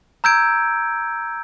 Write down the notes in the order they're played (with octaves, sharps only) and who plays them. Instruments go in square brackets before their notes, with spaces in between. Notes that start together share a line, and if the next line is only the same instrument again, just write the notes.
[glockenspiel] A#5 E6 G6 G#6 D7